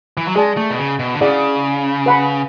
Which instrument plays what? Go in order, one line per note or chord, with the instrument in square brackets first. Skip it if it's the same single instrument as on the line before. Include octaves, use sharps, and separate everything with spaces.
[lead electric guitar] E3
F#3
[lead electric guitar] G#3 [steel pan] G#4 D5 A5
[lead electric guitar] A3
B2
C#3
B2
D3
[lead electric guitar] C#3 [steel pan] E4 G#4 D5 F#5
[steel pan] B4 F#5 B5